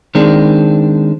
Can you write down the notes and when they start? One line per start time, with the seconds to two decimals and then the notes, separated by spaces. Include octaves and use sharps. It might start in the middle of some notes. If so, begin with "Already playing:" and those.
0.15 D#3 G#3 C4 D4